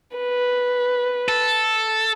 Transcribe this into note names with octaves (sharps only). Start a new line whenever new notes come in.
B4
A4